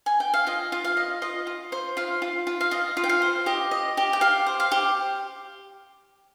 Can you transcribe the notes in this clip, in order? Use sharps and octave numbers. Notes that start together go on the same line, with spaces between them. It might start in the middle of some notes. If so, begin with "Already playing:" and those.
G#5
G5
F5
F4 D#5
F4
F5
D#5
F4 D#5
F4
C5
F4 F5
F4
F4
F5
F4 D#5
F4
G5
F5
C5
G4 D#5
D#5
G4
G5
G4 F5
C5
F5
G4